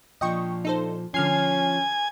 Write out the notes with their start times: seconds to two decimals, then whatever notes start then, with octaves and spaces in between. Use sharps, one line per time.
0.21 A#2 F3 D4 D#5 G5 C#6
0.65 D#4 A4 C5
1.14 D3 F3 C#4 G#5 F6 C7